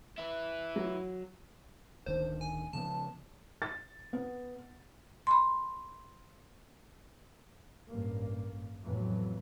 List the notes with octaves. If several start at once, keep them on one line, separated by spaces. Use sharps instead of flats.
E4 B4
F#3
D1 D#3 D4 C5
G#5
C#3 F3 B3 A5
A6
B3
B5 C6
A1 G2 A#3
F2 A2 E3 F#3 A3 B3